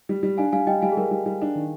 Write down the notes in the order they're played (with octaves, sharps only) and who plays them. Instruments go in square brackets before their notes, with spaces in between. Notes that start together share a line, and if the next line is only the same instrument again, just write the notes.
[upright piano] G3
G3
[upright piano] D4 [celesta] F5 G#5
[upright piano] G3 [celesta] F5 G#5
[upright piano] G3 [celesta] D#5 G5
[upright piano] G3 [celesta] F5 G#5
[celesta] G#4
[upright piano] G3 [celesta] A#4
[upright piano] G3
G3
D4
D#3